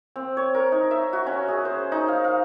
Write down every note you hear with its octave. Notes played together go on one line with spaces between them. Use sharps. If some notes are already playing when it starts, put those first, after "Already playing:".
C4
C#5
A#4
D#4
E5
F#4
C#4
G#4
C5
D#4
F5
F5